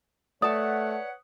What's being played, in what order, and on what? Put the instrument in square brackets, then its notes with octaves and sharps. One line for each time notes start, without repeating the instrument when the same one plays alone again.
[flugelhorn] A3 [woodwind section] B4 C#5 F#5 [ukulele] D5 A5 [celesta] D#6